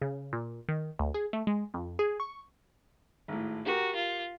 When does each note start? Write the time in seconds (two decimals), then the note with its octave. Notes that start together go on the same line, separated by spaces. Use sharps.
0.02 C#3
0.33 A#2
0.69 D#3
0.99 D2
1.14 G#4
1.33 A3
1.47 G#3
1.74 F2
1.99 G#4
2.20 C#6
3.28 G#1 A2
3.66 F#4 G4 A#4 A#5
3.96 F4